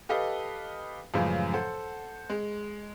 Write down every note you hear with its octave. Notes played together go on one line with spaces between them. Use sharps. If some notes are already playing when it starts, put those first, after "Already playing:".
G4 A4 B4 D#5 F5
F#2 A2 C#3 E3 F3 G#3
A4 C5 F#5
G#3